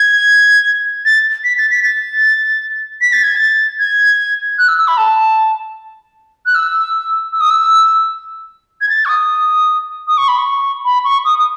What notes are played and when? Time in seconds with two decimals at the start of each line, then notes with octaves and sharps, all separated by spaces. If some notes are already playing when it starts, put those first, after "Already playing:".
Already playing: G#6
1.05 A6
1.44 B6
1.58 A6
1.71 B6
1.84 A6
3.01 B6
3.13 A6
3.24 G#6
3.36 A6
3.79 G#6
4.58 F#6
4.68 E6
4.79 E6
4.88 B5
4.98 A5
6.46 F#6
6.55 E6
7.33 E6
7.41 D#6
7.50 E6
8.81 G#6
8.89 A6
9.05 C#6
9.09 D#6
10.08 D#6
10.18 C#6
10.28 B5
10.38 C#6
10.85 B5
11.05 C#6
11.25 D#6
11.39 D#6